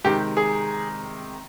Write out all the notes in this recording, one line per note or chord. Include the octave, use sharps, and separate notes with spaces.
C3 D#3 G#3 G4
G#4